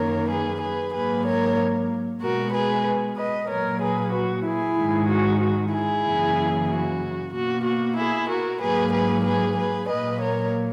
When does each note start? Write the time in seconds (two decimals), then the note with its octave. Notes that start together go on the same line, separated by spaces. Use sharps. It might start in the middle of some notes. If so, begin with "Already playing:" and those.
Already playing: F#2 D#3 F#3 A#3 A#4 C#5
0.29 G#4 B4
0.61 G#4 B4
0.93 G#2 F#3 A#3 G#4 B4
1.26 A#4 C#5
2.21 B2 G#3 F#4 A#4
2.53 G#4 B4
3.17 B4 D#5
3.49 A#2 F#3 A#3 A#4 C#5
3.81 G#4 B4
4.13 F#4
4.45 E4 G#4
4.77 G#2 D#3 G#3
5.09 F#4
5.41 F#4
5.73 E4 G#4
6.05 F#2 C#3 E3 A#3
6.69 F#4
7.33 B2 A#3 F#4
7.65 F#4
7.97 E4 G#4
8.29 F#4 A#4
8.61 G#2 F#3 A#3 G#4 B4
8.92 G#4 B4
9.25 G#4 B4
9.57 G#4 B4
9.89 A#2 F#3 A#3 B4 D#5
10.21 A#4 C#5